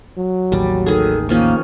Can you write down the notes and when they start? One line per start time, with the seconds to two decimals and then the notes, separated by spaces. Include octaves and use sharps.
0.18 F#3
0.52 A1 D#2 G3
0.86 D#3 G#4 A4
1.29 D#3 F3 A#3 C#4